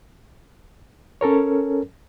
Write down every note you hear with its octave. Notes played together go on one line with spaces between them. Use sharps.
C#4 A4 A#4 C#5